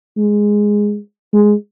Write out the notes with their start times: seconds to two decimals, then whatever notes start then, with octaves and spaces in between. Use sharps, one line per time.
0.17 G#3
1.33 G#3